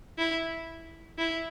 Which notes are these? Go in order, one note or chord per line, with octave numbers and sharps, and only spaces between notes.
E4
E4